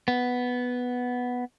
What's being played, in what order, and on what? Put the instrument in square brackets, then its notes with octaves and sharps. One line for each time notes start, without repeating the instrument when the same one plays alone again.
[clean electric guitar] B3